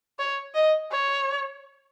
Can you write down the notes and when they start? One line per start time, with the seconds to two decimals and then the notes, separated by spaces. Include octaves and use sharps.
0.19 C#5
0.55 D#5
0.92 C#5